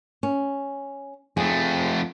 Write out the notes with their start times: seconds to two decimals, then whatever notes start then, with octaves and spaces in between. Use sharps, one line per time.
0.23 C#4
1.37 F2 A3 G#4